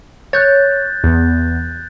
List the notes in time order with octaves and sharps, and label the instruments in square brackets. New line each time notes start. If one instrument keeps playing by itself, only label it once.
[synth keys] C#5 [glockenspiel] F#6 G6 A6
[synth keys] E2